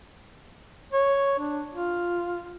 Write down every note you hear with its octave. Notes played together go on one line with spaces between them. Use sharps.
C#5
D4
F4